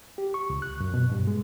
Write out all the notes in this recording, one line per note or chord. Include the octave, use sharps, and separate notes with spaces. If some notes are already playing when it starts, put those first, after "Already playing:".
G4
C#6
C#2
F#6
F#2
B2
G2
G#3